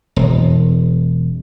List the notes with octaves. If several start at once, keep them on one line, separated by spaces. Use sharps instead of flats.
E1